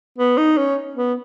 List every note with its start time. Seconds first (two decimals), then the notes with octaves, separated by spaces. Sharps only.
0.18 B3
0.38 D#4
0.57 C#4
0.96 B3